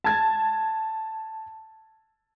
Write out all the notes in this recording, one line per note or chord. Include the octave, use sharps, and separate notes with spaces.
A5 G#6 A6